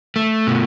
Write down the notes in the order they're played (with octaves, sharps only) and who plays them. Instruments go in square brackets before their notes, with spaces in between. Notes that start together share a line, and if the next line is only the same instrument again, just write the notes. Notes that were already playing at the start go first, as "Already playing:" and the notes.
[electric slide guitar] A3
B2